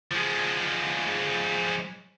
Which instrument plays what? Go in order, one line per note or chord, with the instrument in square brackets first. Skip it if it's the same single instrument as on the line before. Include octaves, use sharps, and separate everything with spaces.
[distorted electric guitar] F3 G#3